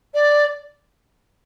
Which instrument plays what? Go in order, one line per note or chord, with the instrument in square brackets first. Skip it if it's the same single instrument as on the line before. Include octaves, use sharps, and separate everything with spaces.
[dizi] D5